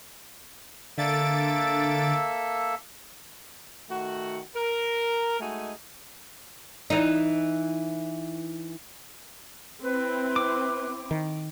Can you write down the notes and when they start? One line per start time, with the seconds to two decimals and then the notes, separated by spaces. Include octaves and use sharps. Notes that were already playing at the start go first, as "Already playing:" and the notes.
0.98 D3 A#3 A4 E5 A6 D7
3.90 D#3 A3 F#4
4.55 A#4
5.40 G#3 A3 D#4 F#4 G#5
6.90 E3 D#4
9.83 C4 E4 B4
10.36 D6
11.11 D#3